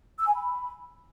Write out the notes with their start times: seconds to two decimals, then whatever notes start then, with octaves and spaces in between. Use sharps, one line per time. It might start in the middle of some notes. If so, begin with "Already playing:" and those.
0.19 E6
0.27 G#5
0.35 B5